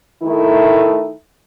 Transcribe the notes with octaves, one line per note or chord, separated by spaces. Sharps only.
D#3 A3 D#4 E4